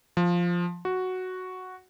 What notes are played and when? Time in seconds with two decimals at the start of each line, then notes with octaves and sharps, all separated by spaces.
0.17 F3
0.85 F#4